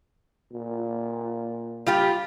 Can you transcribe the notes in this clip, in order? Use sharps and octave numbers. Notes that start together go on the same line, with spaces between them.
A#2
G3 F4 G4